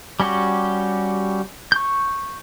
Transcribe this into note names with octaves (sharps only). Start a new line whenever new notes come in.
G3 C#4 F#4 G4
C#6 G6